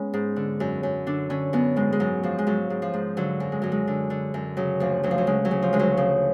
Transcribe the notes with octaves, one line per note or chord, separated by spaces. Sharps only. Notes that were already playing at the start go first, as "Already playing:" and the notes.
Already playing: G#3 B3 C#4
G#2
D3
F#2
F#2
D3 D4
D3 C#4
F#2 B3
G#2 G#3
G#3
G#2 F#3
G#2 F3
G#3
G#2 F#3
G#2
F3
G#2
D3 F#3
F#2
G#3
F#2 F#3
G#3
D3
D3
F#2
C#3 F#3
D2 F3
D2 F#3
F3
F#3
C#3 G#3
F#3
C#3
F3
D2 G#3
F#3
C#3 F3